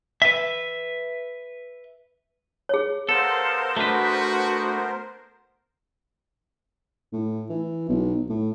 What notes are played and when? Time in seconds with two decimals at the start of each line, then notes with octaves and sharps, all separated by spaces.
0.22 B4 E5
2.69 G#4 C#5
3.09 B3 A4 A#4 C5 F5
3.77 A3 D4 F#4 B4
7.12 A2
7.49 E3
7.88 B1
8.29 A2